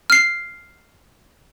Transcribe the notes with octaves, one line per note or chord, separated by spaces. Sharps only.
F6 C7